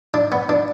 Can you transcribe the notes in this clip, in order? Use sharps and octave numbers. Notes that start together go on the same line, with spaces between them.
D4
B3
D4